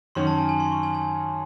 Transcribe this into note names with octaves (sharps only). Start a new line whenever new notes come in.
F#2 D#3 F#3 C#4 C6
A5
G#5
G#5
C6
C#6
G#5
G#5